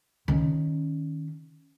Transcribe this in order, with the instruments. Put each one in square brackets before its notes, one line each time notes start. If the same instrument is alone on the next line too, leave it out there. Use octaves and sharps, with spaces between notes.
[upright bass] D#3 C#4